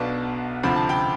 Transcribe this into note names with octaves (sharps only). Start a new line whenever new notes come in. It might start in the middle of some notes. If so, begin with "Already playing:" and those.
Already playing: B1 B2 B3 D4 F5 A5
D2 C3 F3 C4 B5
A5
G5 B5